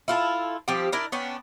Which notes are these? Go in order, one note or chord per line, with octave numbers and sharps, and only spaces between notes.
E4 F4 A4
F3 G3 C4 G4
D4 E4 A#4 D5
B3 C#4 D4 G5